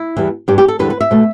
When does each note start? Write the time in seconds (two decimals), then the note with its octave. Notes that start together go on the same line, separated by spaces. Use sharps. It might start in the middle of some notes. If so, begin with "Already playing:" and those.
Already playing: E4
0.16 E2 E3 G3
0.48 G2 G3 G4
0.58 G4
0.68 A4
0.79 E2 D3 G3 B4
0.90 B4
1.01 E5
1.11 B2 A3